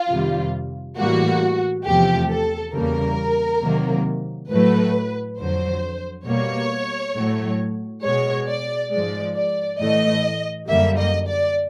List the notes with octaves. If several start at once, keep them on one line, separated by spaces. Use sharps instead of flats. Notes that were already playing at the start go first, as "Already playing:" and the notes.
Already playing: F4
F2 C3 D#3 G3
A2 E3 G3 A#3 F#4
E2 C3 F3 A3 G4
A4
E2 C#3 E3 G3 A#3 A#4
C3 D#3 F#3 A#3
A2 F#3 A3 B4
F2 D3 F#3 C5
B2 G3 A#3 C#5
A2 F#3 A3
B2 G#3 C#5
D5
G#2 F3 G#3 D5
D5
A2 E3 A3 D#5
F#2 D3 G3 A#3 E5
D#5
D5